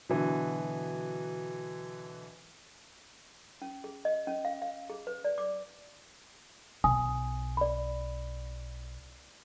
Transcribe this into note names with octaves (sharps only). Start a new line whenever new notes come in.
B2 D3 E3 F#3
C#4
G#4
D#5
C#4
F5
F5
G#4
B4
D5
D6
B1 G#5 D#6
D5 B5